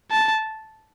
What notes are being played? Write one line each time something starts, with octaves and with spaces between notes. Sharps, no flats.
A5